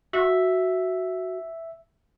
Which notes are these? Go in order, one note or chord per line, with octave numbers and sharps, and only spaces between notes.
F#4 E5